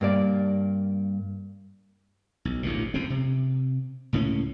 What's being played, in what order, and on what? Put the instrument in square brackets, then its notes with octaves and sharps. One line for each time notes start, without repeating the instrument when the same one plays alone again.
[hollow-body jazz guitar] G2 A#3 D5
[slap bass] B1
A1 D2 A#2
F#1 F2 C#3 C4
C3
C#2 A2 A#3 C#4